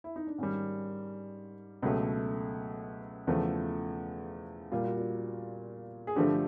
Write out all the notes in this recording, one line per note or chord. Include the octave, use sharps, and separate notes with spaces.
E4
D#4
D4
G#2 D#3 G3 C#4
C#2 B2 F#3 A3
E2 C#3 F3 A3
A#2 G3 F4
F#4
F4
G#4
G2 D3 F3 A3 G4